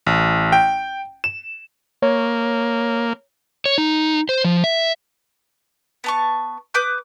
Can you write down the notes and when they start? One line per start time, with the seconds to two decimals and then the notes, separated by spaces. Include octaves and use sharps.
0.06 A1
0.52 G5
1.24 E7
2.02 A#3 C#5
3.66 C#5
3.78 D#4
4.29 C5
4.45 F3
4.64 E5
6.04 B3 A5 C#6
6.74 B4 D6 D#6 G6